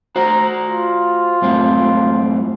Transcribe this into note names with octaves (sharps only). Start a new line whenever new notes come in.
F#4 C5 A#5
F4
F#2 A2 C4